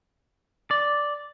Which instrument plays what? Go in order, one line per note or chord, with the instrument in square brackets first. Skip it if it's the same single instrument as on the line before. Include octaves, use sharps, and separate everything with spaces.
[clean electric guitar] D5